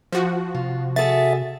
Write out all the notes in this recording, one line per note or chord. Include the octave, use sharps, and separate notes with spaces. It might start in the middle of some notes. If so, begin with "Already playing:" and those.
F3 F#4
C3 F4
F#4 G#4 A4 E5 A6